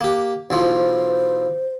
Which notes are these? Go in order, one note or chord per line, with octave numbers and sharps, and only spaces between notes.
A#3 G4
B1 E3 F3 C5